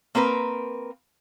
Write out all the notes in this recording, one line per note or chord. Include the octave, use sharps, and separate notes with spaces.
A#3 C4 A#4 B4